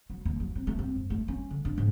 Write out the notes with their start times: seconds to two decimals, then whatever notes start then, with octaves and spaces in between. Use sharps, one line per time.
0.10 F#3
0.25 D#2
0.40 F#3
0.55 C4
0.67 A3
0.79 C4
0.96 F#2
1.10 A3
1.28 C#4
1.51 D3
1.65 D4
1.78 G#2